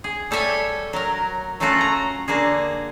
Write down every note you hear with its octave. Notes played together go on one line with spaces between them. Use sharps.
G#4
G3 A4 C#5 E5 G#5
F#3 A#4
F#3 A3 C#4 F4 F#4 A4
A#5
D3 A#3 F#4 G#4